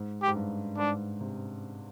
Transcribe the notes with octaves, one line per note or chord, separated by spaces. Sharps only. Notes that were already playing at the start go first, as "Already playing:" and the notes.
Already playing: G#2
G4
G#2
G2
G#2 D4
C3